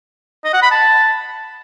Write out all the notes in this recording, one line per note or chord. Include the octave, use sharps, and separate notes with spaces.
D#5
F#5
B5
A5